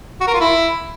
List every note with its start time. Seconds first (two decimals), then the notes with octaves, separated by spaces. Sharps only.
0.21 F#4
0.27 A#4
0.34 F4
0.40 E4